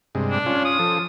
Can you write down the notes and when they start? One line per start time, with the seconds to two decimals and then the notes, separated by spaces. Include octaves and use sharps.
0.15 G2 C3 G#3
0.31 D4
0.46 C#4 F4
0.65 D#6
0.79 F3 A4